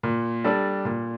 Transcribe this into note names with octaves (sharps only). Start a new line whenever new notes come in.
A#2
G3 D4 A4 D5
A#2